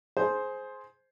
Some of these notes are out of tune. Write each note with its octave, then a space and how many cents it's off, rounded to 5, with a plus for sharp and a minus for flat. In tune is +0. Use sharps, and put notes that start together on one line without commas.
G#4 +20 C5 +0